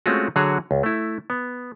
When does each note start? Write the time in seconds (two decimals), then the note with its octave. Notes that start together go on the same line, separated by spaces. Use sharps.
0.06 G#3 A3 C4 C#4 F4 F#4
0.36 D3 F#3 F#4 G#4 C#5
0.71 C#2
0.83 A3 E4
1.30 B3